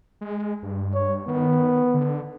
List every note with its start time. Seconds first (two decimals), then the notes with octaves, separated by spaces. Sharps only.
0.21 G#3
0.63 G2
0.94 C#5
1.27 D#3 B3
1.94 D3